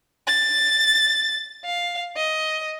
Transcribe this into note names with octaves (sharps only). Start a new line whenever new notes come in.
A6
F5
D#5